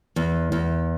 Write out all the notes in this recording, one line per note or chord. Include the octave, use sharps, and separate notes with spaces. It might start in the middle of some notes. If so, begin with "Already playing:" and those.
E2
E2